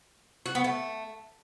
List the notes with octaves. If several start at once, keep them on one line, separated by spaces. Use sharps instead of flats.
F#4
B3
A3